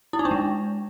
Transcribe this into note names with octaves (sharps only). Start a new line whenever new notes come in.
E4
D#4
D4
G#3